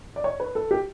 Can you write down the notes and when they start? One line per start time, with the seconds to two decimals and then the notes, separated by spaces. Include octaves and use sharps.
0.16 D5
0.24 C#5
0.40 B4
0.55 A4
0.71 G4